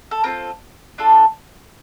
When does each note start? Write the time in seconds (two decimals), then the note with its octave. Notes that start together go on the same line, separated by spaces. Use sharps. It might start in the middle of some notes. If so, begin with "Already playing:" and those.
0.11 A4
0.24 C4 F4 A4 A#4
0.98 D4 F4 A4